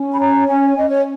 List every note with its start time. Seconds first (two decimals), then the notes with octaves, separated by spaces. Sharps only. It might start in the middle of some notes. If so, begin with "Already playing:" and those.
Already playing: C#4
0.13 B5
0.20 C#5 A#5
0.48 C#4 G#5
0.76 C#4 D#5
0.90 C#5